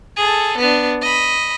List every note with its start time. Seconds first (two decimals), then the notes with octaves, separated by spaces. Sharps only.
0.17 G#4 A4
0.58 B3 D4
1.02 D#5 B5